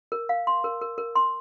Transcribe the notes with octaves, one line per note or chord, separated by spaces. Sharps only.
A#4
F5
C6
A#4
A#4
A#4
C6